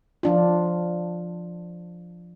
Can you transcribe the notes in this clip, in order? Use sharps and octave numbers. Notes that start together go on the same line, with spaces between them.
F3 D4 F4